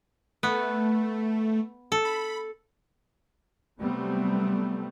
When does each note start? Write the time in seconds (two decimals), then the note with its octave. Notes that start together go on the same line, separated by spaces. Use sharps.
0.43 A3 B3
1.92 A4
2.05 B5
3.80 C3 F#3 G3 A3 B3 C4